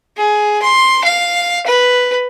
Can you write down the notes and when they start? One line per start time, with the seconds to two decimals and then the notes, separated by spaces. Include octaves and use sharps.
0.17 G#4
0.62 C6
1.04 F5
1.66 B4